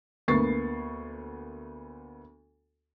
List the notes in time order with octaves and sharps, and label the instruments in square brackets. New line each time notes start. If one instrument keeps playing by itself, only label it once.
[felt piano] D2 A#3 B3 C#6 A6 C7